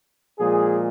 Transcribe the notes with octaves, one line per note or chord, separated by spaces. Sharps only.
A#2 F3 G#3 G#4